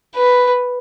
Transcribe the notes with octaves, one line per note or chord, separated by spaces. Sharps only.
B4